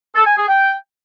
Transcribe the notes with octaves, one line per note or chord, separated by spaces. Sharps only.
A4
G#5
G#4
G5